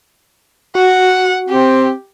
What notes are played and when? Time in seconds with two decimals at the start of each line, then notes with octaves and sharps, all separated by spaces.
0.75 F#4 F#5
1.49 C4 G4